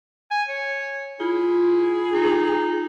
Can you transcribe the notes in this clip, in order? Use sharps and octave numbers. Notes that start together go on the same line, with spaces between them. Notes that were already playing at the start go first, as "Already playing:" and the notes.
G#5
C#5
E4 F4 G#4
D#4